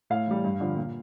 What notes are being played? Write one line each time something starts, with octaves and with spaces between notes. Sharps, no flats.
A2 F5
E3 G3
G2
D3 F3
A#2